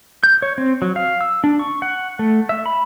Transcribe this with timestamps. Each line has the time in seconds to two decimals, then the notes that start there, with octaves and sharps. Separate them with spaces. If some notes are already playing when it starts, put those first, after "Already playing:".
0.24 G6
0.42 C#5
0.58 C4
0.82 F#3
0.96 F5
1.21 E6
1.44 D4
1.59 C#6
1.82 F#5
2.19 A3
2.49 E5
2.66 B5